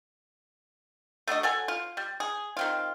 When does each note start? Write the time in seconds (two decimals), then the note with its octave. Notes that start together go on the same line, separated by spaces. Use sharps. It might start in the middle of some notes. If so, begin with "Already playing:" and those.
1.28 A3 D4 F#4 D#5
1.43 F#3 A4 F#5 G#5
1.68 F4
1.97 G3
2.20 G#4
2.57 D#3 C4 F4